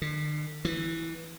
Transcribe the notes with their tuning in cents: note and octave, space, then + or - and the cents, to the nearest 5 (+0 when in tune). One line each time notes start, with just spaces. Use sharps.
D3 +45
E3 -5